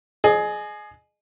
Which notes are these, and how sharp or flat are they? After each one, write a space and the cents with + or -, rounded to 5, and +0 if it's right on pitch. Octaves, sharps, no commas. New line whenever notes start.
G#4 +20 D#5 -30